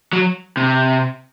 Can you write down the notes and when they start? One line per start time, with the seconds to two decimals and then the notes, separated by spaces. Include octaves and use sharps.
0.13 F#3
0.57 C3